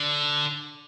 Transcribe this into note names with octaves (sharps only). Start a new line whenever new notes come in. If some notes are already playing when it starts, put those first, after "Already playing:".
Already playing: D3